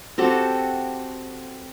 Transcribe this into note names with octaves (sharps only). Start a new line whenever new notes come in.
C4 F#4 G4 A4